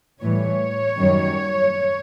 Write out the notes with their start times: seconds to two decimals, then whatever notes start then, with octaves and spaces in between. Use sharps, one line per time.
0.22 A2 E3 G3 C#5
0.98 F#2 D#3 G3